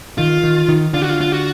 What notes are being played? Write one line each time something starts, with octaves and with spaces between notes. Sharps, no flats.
D#3 F4
D#3
D#3
D3 F4
F#4
F4
F4
F#4